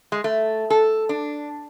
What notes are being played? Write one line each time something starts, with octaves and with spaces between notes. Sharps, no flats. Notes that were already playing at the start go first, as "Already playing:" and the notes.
G#3
A3
A4
D4